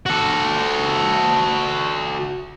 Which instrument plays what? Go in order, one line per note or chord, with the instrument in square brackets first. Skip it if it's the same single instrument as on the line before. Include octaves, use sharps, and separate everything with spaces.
[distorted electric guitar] F#4 A4